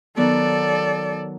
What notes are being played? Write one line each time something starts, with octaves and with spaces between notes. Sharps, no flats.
D#3 F#3 B3 A4 D5